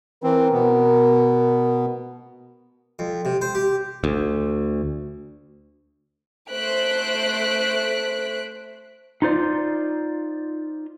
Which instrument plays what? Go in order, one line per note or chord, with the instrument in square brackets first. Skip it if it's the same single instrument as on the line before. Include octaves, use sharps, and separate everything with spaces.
[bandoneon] E3 C4 [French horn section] A#4
[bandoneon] B2 B3
[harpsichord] F2
C3
C5
G4
[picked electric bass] D2
[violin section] A3 C5 F#6 B6 D7
[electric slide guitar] D#4 F4 C5 D5